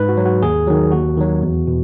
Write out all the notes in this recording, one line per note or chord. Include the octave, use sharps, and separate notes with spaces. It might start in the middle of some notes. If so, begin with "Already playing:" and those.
Already playing: G#2 B4
F#4
F#3
F#4
D#2 G#4
D#3 F#3
D#2 F#4
D#3 F#3
E2
B2